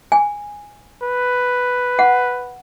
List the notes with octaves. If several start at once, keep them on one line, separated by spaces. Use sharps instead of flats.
G#5
B4
F#5